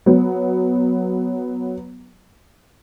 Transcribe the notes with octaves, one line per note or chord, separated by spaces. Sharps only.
F#3 B3